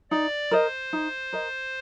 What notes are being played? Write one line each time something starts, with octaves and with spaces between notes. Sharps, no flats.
D#4 D5
A#4 C5 D#5
D#4
A#4 D#5